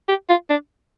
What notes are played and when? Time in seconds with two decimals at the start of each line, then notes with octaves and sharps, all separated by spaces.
0.08 G4
0.29 F4
0.50 D4